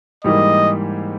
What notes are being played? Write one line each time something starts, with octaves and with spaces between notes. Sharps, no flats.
G#2 E3 G3 A#3 D#5